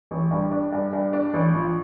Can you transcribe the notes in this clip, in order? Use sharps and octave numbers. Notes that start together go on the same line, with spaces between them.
A1
G2
D4
G2
G2
D4
A1
F3